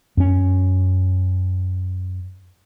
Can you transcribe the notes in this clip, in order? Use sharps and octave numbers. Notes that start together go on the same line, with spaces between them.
F#2 C#4